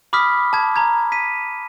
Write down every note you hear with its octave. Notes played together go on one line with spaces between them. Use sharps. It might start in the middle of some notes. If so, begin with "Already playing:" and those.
B5 D6 D#6 F6 B6
A5 G#6
A#5 G#6
B6 D#7